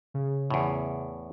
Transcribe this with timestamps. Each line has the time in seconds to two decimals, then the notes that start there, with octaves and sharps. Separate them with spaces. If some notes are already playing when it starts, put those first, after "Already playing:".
0.14 C#3
0.50 E2 A2